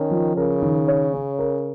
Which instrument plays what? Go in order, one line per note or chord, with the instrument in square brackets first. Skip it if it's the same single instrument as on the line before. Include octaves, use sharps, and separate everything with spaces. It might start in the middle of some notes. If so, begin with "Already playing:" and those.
Already playing: [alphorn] D#3 [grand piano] C#4
[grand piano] F3
[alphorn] C#3 [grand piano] A#4
[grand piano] D#3
C#5
C#4
A#4